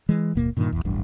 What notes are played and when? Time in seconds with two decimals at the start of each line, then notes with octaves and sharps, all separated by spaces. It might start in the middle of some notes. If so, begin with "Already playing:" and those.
0.09 E3 G#3
0.35 F#1 D#2 B2 A#3
0.57 G2 A#2 D#3
0.72 A#1 E2
0.85 D1 A1 G2